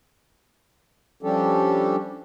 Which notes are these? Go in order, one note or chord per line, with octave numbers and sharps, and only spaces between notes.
F3 G3 C#4 D4 G4 A4